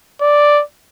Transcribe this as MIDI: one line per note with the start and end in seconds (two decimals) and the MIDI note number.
0.21 0.62 74